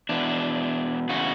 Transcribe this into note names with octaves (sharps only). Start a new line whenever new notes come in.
E2 B2 D4
E2 C#3 F#4